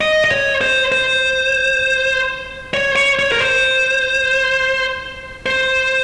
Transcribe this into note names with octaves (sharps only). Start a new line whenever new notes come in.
D#5
D#5
C#5
C5
C5
C#5
C#5
C#5
A#4
C5
C5